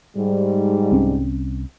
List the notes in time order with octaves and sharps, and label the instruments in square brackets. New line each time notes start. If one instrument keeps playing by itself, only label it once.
[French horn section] G#2 G3
[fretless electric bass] C2 C4 C#4